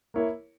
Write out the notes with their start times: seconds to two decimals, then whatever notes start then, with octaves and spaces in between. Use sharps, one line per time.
0.14 A#3 E4 A#4 C#5